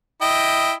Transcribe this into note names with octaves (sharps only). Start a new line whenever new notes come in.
E4 D#5 G5